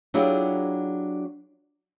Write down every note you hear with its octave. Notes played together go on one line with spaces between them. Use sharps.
F#3 D4 E4 F4 G4 G#4